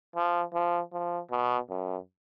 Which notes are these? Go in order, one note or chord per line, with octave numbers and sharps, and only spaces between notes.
F3
F3
F3
B2
F#2